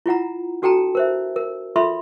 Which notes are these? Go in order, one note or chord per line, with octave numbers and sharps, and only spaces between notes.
E4 F4 F#5 A#5
D4 F#4 A4 G5 A5 A#5
A#4 C5 E5
A#4
F4 A4 E5 B5 C6